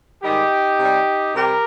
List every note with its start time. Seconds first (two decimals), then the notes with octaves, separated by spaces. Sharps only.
0.23 G#2 D#3 G3 D#4 G4
0.80 C3 G3
1.35 C3 G3 G4 A#4